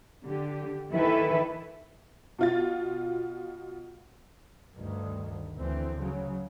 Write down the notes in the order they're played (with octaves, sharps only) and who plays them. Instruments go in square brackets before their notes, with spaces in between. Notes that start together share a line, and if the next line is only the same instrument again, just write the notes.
[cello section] D3 G4
D#3 E3 E4 A4 B4 E5
[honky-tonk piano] B2 F4 A6
[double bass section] D2 G2 D#3
D2 E3 C4
C#3 F#3